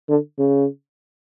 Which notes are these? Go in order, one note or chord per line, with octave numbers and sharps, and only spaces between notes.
D3
C#3